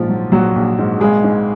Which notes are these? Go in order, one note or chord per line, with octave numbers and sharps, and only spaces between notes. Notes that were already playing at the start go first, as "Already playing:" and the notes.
Already playing: A#1 G#2 F3 F4
F#3
A#1 F#3 F#4
A#1
G#2
G#1 G#3 G#4
G#2